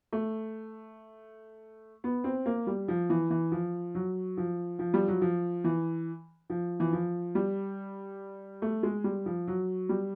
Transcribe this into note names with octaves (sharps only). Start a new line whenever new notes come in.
A3
B3
C4
A#3
G3
F3
E3
E3
F3
F#3
F3
F3
G3
F#3
F3
E3
F3
E3
F3
G3
A3
G#3
G3
F3
F#3
G3